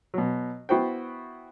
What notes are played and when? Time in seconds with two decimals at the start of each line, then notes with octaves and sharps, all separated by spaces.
0.14 B2 F#3
0.69 B3 E4 F#4 C5 G5